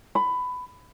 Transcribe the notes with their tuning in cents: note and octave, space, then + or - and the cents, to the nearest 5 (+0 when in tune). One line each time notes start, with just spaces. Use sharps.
B5 +15